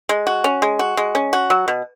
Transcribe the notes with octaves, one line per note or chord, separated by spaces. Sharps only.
G#3
F#4
C#4
G#3
F#4
G#3
C#4
F#4
F#3
B2